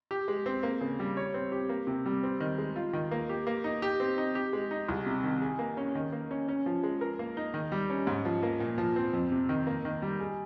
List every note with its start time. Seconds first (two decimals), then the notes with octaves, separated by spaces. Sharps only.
0.11 G4
0.28 G#3
0.46 C4
0.63 A#3
0.81 C#3
0.99 G3
1.17 C#5
1.34 C4
1.52 G4
1.69 A#3
1.87 C3
2.06 G3
2.23 C4
2.40 D#3
2.58 G#3
2.76 F4
2.93 D#3
3.11 A#3
3.29 G4
3.47 A#3
3.64 D#4
3.82 G4
4.00 C4
4.18 D#4
4.35 G4
4.53 G#3
4.71 D#4
4.88 C2
5.06 C3
5.23 D#3
5.42 G#4
5.59 A#3
5.77 C#4
5.95 D#3
6.12 A#3
6.31 C#4
6.48 C#4
6.66 F3
6.83 G#3
7.01 A#4
7.19 A#3
7.37 D#4
7.54 D#3
7.72 G3
7.90 C#4
8.07 G#2
8.25 F3
8.43 A#3
8.60 A#2
8.78 F3
8.96 C4
9.13 F2
9.32 C3
9.49 D#3
9.67 A#3
9.85 D#3
10.02 G3
10.20 G#4